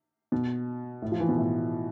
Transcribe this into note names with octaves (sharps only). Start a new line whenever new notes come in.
B2
A2
F3
E3
B2
A2